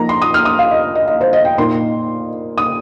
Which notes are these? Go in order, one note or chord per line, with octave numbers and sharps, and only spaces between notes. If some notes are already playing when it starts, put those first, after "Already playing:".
Already playing: F3 A#3 D#4 A#5
C6
D#6
F6
D#6
F5
D#5
D#5
D#5
C5
D#5
G5
A#2 A#3 D#4 C6
D#6